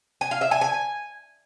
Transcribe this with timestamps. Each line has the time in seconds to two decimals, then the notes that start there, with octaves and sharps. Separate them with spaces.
0.21 G#5
0.31 F5
0.41 E5
0.51 G#5
0.61 G#5